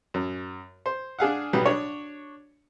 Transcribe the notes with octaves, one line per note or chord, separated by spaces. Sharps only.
F#2
C5
D4 G#4 F5 F#5
B1 F#3 G3 B3
D4 C#5